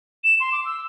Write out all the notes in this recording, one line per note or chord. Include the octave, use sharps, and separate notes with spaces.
E7
C6
D6
E6